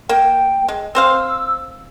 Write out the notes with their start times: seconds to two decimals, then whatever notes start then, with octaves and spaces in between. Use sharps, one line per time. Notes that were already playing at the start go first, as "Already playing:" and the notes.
0.09 A#3 G5
0.68 G#3
0.95 C4 C5 F5 E6